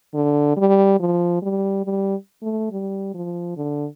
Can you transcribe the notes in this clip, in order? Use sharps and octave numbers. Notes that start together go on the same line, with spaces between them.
D3
G3
F3
G3
G3
A3
G3
F3
D3